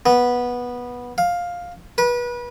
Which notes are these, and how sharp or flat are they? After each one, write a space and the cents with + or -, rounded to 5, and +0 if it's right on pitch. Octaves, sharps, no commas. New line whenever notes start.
B3 -10
F5 +10
B4 -30